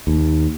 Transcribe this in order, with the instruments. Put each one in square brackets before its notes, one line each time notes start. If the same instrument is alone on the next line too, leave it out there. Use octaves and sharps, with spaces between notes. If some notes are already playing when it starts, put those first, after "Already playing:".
[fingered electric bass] D#2